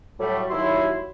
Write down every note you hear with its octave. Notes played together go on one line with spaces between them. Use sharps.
A2 F#3 G3 A3
D#2 F#3 E4 C6